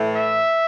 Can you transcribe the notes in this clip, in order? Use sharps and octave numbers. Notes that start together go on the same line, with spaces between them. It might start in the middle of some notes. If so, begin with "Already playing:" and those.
Already playing: A2 E3 A3
E5